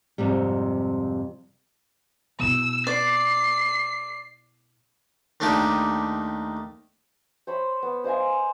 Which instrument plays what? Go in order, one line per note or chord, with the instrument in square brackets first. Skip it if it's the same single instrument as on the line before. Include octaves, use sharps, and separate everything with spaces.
[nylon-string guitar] F2 G#2 C3 G3
[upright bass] B2 E4 [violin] E6
[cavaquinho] D5 [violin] C7
[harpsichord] D#2 A3 D4 D#4 G4
[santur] C5 C#5 B5
B3
C5 D#5 F5 G#5